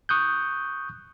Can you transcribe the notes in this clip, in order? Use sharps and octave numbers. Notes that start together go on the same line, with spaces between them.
C#6 D#6 F#6 G6